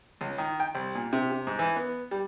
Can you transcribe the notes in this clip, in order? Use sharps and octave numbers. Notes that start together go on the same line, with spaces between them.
C#2
D#3
G5
C2
A#2
C3
C3
G#2
E3
B3
G3